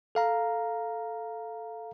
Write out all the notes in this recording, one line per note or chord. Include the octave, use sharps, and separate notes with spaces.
A4 F5 A#5